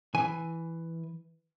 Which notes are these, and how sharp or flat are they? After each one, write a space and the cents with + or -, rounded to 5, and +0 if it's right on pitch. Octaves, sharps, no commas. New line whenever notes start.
E3 +0 G#5 +0